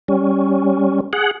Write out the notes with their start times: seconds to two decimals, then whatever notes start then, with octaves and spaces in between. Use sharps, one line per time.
0.08 G3 C#4
1.13 G#4 F#5